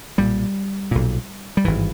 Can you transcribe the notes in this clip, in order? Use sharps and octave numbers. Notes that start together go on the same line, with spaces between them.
B1 A#2 G3
B1 A#2
G3
G#1 G2 E3